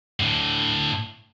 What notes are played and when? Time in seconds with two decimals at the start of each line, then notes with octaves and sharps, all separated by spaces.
0.20 A2 D3